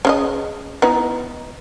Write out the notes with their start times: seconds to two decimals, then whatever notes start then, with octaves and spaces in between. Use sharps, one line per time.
0.05 C#3 F4 D#5
0.82 B3 D#4 E4